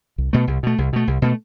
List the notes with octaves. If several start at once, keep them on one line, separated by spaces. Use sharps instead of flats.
C2
B2 A3
C2
B2 A3
C2
B2 A3
C2
B2 A3